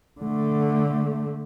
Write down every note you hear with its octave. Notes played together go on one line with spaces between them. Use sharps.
D3 A3